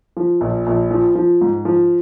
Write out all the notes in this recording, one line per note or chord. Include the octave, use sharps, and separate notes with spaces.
F3
A#1
A#1
F3
F3
G#2
F3